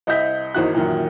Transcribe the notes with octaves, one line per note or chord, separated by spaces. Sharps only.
C2 D#5 E5 G6 B6
G#1 E2 A#3 D#4 F#4 F#6
F#2 A#2 D#3 E3